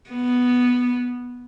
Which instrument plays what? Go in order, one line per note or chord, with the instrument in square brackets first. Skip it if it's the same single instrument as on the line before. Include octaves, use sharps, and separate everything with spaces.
[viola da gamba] B3